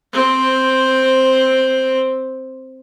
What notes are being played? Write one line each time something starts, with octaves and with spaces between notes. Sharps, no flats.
C4 C5